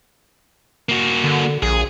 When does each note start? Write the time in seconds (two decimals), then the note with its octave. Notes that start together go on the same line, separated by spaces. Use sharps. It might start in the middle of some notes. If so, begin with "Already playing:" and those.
0.89 A#3 F#4
1.24 D3
1.63 A#1 G#4